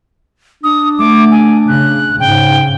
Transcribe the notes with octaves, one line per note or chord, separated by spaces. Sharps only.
D4 D#6
A3 D6
G#5
C#3 F#6
G#2 C#3 G5